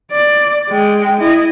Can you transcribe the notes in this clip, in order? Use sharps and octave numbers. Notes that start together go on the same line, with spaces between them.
D5
G#3 G5
E4 D#5